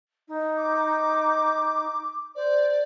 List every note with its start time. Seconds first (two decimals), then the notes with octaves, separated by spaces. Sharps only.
0.28 D#4
0.57 D6
2.36 C5 D5